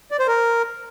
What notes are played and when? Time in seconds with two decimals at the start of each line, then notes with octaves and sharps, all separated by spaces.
0.11 D5
0.19 C5
0.28 A#4